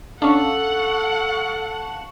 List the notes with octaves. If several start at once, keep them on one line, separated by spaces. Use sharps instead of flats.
C#4 D4 A4 F5 F#5 A5 C#6